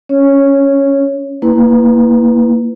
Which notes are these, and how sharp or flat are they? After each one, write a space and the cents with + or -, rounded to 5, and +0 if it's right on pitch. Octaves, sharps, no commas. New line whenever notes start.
C#4 +0 C#5 -5
A#3 +0 E4 -20 B4 +0